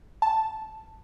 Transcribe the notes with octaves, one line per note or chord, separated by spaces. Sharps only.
A5